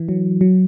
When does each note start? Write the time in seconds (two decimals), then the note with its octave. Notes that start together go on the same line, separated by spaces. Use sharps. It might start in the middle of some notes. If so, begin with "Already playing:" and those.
Already playing: E3
0.09 F#3
0.41 F#3